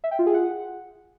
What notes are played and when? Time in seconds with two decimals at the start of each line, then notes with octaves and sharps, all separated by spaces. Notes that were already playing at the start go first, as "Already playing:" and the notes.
0.04 E5
0.11 G5
0.19 F4
0.26 G#4
0.34 F#5